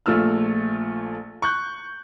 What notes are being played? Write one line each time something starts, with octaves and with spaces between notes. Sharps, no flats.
A#1 A3 F4 E6 F6
C#6 F#6 G6